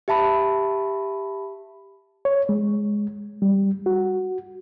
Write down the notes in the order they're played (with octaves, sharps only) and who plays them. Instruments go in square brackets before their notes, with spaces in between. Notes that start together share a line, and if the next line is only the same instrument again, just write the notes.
[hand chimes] G4 E5 A5 B5
[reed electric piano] C#5
G#3
G3
F#4